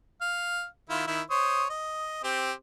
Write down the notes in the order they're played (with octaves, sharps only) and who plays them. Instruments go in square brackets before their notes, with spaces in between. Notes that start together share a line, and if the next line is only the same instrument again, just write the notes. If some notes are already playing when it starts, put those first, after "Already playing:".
[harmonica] F5
D#3 E4 F4
D#3 E4
C5 C#5 D#6
D#5
C4 G4